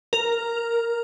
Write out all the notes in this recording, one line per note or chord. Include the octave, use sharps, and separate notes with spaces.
A#4